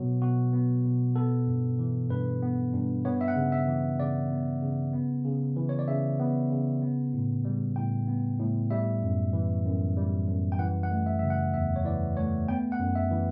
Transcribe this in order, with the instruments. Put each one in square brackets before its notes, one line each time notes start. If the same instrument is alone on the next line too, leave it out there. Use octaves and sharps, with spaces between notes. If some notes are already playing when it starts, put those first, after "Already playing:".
Already playing: [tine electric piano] B2 F#3 B3 F#4
B2 F#4
B3
B2
B3 A4
G2
E3
G2 B4
B3
G2
B3 C#5
E5
F#5
C#3
E5
E3
C#3 D5
B3
C#3
B3
C#3
E3
C#5
D5
C#3 E5
B3
C#3
B3
A2
G3
A2 G5
B3
A2
G3 E5
F#2
E3
F#2
G3
F#2
G5
E3 F#5
F#5
A3
E5
C#3 E5
F#5
E2 E5
C#5
E3 D5
A3 C#5
B3 G5
F#5
F#2
E5
E3